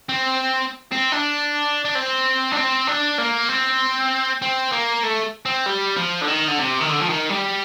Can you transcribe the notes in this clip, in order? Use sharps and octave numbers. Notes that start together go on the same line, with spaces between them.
C4
C4
D4
D4
C4
D4
C4
D4
A#3
C4
C4
A#3
A3
C4
G3
F3
D3
D#3
D3
C3
D#3
D3
F3
D#3
G3